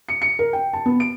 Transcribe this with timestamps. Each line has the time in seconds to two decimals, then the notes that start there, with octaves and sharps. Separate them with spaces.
0.09 C#7
0.22 C#7
0.39 A#4
0.53 G5
0.73 A5
0.86 B3
1.00 D7